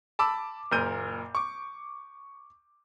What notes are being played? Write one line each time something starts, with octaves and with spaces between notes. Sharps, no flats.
A5 B5 D6 E6
F#1 A#2 A#4 G6 D#7
C#6 D6